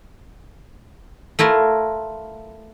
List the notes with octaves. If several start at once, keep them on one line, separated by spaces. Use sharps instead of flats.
A3 E4 F4 A#4